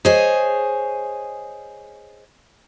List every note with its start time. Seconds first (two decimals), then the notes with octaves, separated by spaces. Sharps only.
0.05 G#4 C5 C#5 D#5 G#5